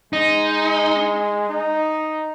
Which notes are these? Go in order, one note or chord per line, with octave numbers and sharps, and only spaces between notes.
G#3 D#4
D#4